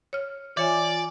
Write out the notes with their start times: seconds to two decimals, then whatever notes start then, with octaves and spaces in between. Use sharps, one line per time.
0.13 C#5 F6
0.57 E3 F4 C#5 D5 E5 G#5